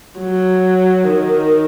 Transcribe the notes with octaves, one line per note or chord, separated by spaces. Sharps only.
F#3
D#3